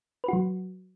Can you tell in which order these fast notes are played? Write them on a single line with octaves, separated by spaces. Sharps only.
B4 F#4 F#3